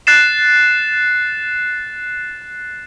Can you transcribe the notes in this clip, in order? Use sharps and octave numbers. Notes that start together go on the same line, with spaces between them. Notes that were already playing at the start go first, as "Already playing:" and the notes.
F#6 A6 C7 E7